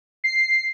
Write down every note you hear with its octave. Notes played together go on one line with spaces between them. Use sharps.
C7